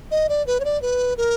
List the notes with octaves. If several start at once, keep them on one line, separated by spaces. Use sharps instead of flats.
D#5
D5
B4
C#5
D5
B4
A#4